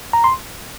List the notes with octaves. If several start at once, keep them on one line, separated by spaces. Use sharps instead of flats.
A#5
C6